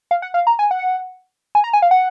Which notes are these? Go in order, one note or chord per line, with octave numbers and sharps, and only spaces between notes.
F5
F#5
F5
A#5
G#5
F#5
G#5
A#5
G#5
F5
F#5